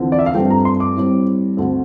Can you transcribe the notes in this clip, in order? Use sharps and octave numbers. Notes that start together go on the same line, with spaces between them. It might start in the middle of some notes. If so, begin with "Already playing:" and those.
Already playing: E2 D3 F3 C4
D5
E5
F5
G2 F3 A3 C4 G5
A#5
C6
D6
A2 G3 C4
D2 D3 A3 C4